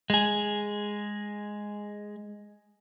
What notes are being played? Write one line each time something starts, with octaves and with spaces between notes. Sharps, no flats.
G#3 G#4